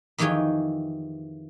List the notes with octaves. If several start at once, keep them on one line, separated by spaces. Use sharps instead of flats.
F2 D#3 E3 G4 G#4 C#5